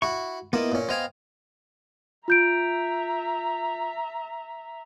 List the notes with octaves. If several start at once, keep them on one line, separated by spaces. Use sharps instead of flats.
E4 F#4 C#6
A#3 B3 E4 F4 D#5
A#2 C#4
B3 C5 D#5 F5 G5 G#5
F4 E5 A#5 G6 D7